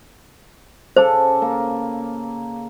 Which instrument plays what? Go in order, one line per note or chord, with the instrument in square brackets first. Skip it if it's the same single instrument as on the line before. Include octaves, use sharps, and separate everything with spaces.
[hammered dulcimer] C#3 A4 D6 [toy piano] C5
[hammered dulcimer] A#3